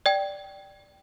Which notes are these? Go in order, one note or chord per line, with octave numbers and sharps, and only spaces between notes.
D5 G5